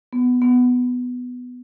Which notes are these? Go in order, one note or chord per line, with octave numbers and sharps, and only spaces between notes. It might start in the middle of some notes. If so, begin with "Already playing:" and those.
B3
B3